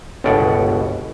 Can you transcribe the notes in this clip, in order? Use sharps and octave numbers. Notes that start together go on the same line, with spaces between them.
G1 C#2 B2 D5 F#5